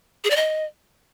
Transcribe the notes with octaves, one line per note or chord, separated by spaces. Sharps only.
G#4
D5
D#5